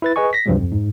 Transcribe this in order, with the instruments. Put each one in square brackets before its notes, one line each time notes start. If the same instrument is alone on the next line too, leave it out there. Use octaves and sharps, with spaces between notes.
[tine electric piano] E4 B4 A6
G#4 B4 D#5 G#5 C#6
A#6 B6
C#2 G2 C3 F3 F#3 G#3
F2
G#2